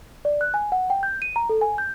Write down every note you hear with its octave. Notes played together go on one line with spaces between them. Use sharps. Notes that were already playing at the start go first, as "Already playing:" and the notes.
D5
F#6
G#5
F#5
G5
G6
D#7
A#5
A4
G#5
G6